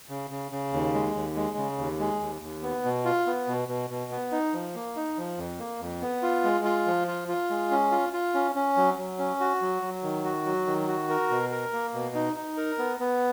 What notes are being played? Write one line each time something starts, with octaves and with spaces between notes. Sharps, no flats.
C#3
C#3
C#3
D#2
G#3
D#2
G#3
C#3
D#2
G#3
D#2
D#2
B3
B2
F4
B3
B2
B2
B2
B3
D#4
F3
A#3
D#4
F3
F2
A#3
F2
B3
F4
G#3
F4
F3
F4
F4
G#3
C#4
F4
F4
C#4
C#4
F#3
F#3
C#4
F#4
F#3
F#3
D#3
F#4
F#3
D#3
F#4
A#4
B2
A#4
A#3
B2
D#4
D#4
A#4
B3
B3